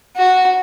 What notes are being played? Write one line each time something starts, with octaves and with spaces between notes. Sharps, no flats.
F#4